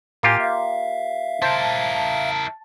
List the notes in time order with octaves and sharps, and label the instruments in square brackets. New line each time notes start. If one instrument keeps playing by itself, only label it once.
[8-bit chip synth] A2 G#5 [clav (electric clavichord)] A#3 F4 G4
[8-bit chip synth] E5 F5
[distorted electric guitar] E4 A#4 [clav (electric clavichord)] C5 [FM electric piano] A5